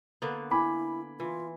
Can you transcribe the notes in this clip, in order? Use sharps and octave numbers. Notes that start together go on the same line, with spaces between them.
D3 A#3 B3
E4 G#5 B5 D6
E3 F4